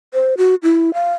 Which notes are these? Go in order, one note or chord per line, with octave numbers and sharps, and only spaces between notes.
C5
F#4
E4
F5